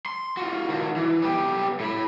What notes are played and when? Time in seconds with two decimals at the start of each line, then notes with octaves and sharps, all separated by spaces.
0.06 C6
0.37 F4 F#4
0.69 D#3 F#4
0.96 E3
1.22 B3 G4
1.80 A2 B5